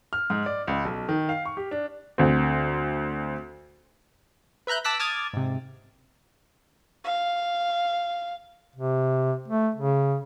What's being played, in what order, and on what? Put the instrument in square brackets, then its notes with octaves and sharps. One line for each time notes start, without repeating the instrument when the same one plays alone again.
[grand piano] F6
G#2
D5
C#2
B1
D#3
F5
C#6
G4
D4
[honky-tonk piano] D2 C4
[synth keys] B4 E5 A#5 F#6 G6
A5 D6 E6 F#6 A#6 B6
A5 D6 D#6 F6 G#6 A6
G#2 C3
[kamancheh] F5
[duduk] C3
A3
C#3